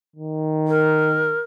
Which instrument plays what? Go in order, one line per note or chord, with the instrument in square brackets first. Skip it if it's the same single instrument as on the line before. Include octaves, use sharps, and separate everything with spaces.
[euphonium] D#3
[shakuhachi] A#4